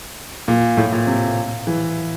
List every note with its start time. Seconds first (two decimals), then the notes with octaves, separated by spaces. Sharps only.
0.48 A#2
0.77 A2
0.92 A#2
1.07 C3
1.67 E3